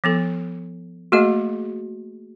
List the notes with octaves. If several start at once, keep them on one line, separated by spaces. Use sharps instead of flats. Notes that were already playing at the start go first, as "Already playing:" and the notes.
F3 B3 A4
A3 A#3 F#4 G#4 D#5